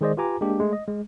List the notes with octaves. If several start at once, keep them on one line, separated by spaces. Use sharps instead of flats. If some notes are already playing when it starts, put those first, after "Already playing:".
D#3 G#3 G#4 C5 D5 D#5
F4 G4 B4 G#5 A#5 D6
G#3 A#3 D4 G4
G#3 A3
D#5
G#3